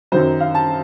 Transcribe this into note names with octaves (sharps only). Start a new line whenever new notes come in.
F#2 D#3 F#3 C5
F5
A5